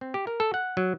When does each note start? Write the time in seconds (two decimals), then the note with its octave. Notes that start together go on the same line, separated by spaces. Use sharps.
0.01 C4
0.14 G4
0.27 A#4
0.40 A4
0.54 F#5
0.77 F#3